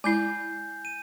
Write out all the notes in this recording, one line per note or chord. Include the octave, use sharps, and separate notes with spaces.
G#3 E4 G#5 G6
D#7